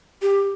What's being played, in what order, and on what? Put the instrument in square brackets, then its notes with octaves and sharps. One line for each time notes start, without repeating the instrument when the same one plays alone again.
[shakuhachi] G4